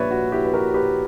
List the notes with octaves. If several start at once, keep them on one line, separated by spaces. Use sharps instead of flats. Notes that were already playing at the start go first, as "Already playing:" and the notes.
Already playing: A#1 A#2 G3 B4 C#5 D5 E5
F#4
E4 G4
B4
F#4 A#4
G4 B4